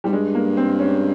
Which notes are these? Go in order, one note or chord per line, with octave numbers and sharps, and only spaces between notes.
G#2 G3
G2 G#3
A#3
C4
C#4